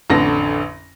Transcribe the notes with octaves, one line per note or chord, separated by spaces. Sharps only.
A1 F2 D3 A#6